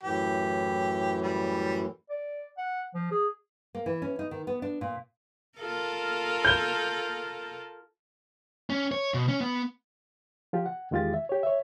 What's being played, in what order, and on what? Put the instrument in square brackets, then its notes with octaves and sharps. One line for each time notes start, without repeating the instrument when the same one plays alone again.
[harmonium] F#2 A2 E3 [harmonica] G4
[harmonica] G3
[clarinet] D5
F#5
F3
G#4
[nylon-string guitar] A#3
E3
C#4
D#4
D#3
B3
D4
A#2
[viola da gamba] F4 A4 A#4
[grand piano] G6 G7
[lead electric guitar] C#4
C#5
B2
C#4
B3
[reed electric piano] F3 F4 G4
F#5
E2 D#3 G#3 F4 G4 A6
E5
G4 C#5
C#5 E5